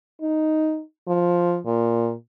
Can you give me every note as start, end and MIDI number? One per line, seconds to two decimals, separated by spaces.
0.21 0.81 63
1.08 1.59 53
1.66 2.13 46